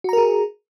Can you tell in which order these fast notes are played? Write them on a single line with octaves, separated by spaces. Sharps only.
F#4 A#5 A#4 G#4